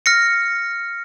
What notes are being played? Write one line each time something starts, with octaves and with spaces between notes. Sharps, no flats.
F6 A#6 C#7